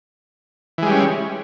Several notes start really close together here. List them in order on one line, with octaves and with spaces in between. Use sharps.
E3 G#3 G3 C#4